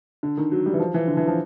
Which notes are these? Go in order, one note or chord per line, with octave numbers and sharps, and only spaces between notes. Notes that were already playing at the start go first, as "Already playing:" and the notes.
D3
D#3
F#3
G3
E3
F3
E3
D3
E3
F3